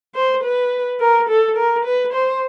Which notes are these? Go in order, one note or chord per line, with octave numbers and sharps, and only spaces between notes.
C5
B4
A#4
A4
A#4
B4
C5